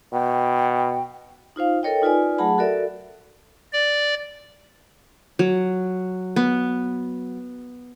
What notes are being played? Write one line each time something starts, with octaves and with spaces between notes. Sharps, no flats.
B2 G5
D#4 F4 C5 F5
A4 A#4 C#5 D#5 G5
D#4 F4 B4 D5 G#5
F#3 A3 G#4 F#5 A5 B5
F#4 A4 A#4 D5 E5
D5
F#3
B3